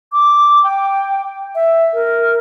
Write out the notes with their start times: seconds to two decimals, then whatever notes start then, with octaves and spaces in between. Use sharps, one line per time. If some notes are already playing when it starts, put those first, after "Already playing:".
0.12 D6
0.64 G5
1.55 E5
1.93 A#4